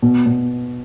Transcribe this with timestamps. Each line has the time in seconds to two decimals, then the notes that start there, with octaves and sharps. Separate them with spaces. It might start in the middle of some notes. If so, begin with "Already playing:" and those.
0.02 B2
0.26 B2